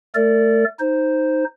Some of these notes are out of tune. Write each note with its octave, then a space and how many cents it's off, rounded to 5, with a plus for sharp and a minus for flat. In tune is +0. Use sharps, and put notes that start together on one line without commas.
A3 +0 A#4 -45 D5 -15
D#4 +0 C5 +0